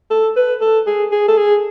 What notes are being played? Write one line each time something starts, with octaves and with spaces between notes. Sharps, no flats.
A4
B4
A4
G#4
G#4
A4
G#4